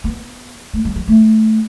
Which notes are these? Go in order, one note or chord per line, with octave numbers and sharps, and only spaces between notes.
B3
A3
G3
F#3
A3